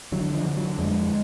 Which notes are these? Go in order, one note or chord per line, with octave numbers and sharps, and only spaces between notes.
D3 F#3
F3
D3
F#3
F2 G#3